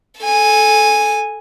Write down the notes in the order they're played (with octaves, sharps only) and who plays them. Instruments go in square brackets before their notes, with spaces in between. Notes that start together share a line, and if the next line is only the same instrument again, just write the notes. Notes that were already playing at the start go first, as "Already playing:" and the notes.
[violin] A4 G#5